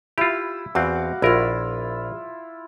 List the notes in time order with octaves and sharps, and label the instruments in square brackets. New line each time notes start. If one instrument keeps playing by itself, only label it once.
[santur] E4 [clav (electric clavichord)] F4 G4
[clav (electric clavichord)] E2 C4 [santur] F#4 F5 D6
[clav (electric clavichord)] A#1 A#4 [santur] E4 F4